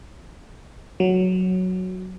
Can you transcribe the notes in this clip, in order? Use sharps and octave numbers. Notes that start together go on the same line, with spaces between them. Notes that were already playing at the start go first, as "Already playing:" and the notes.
F#3